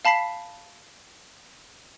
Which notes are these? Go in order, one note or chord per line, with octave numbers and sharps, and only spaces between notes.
F5 A5 B5 B6 C7